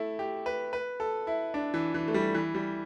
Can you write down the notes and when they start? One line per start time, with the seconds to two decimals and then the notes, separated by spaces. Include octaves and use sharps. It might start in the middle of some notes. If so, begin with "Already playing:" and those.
Already playing: A3 E4
0.19 G4
0.46 B4
0.73 B4
1.00 A4
1.27 E4
1.54 D4
1.74 E3
1.94 E3
2.08 A3
2.14 G3
2.34 E3
2.54 G3